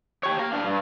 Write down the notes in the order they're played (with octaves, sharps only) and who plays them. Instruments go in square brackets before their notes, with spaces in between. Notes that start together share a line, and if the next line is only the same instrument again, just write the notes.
[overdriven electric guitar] G4 C#5
A#4 F5
D4 F5
G2